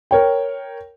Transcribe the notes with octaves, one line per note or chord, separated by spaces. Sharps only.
A#4 C#5 G5